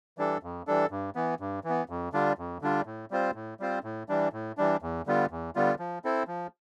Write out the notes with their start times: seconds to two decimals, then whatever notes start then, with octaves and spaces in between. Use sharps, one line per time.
0.18 E3 G3 D4 A4
0.43 F2
0.67 E3 G3 D4 A4
0.91 G2
1.15 E3 B3
1.40 G2
1.64 E3
1.70 B3
1.89 F2
2.13 D3 G3 D4 F4
2.38 F2
2.61 D3 G3 D4 F4
2.86 A2
3.11 G3 C4 F4 C5
3.35 A2
3.60 G3 C4 F4 C5
3.84 A2
4.09 E3 G3 D4
4.33 A2
4.57 E3 G3 D4
4.82 E2
5.06 D3 G3 B3 F4
5.31 E2
5.55 D3 G3 B3 F4
5.79 F3
6.04 C4 E4 A4 C5
6.28 F3